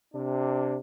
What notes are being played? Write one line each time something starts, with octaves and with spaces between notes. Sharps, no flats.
C3 D4